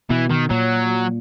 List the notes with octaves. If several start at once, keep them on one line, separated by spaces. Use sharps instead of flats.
B2 E3
D#3
A#2 F#3